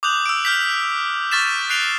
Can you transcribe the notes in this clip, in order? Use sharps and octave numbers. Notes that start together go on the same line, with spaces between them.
D6 D#6 F#6 G6 F7 F#7
E6 D7
F6 G6 B6
C#6 F6 A6 B6 E7
F#6 C7 D7 F7 G7